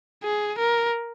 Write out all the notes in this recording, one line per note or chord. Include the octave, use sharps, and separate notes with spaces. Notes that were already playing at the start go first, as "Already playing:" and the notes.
G#4
A#4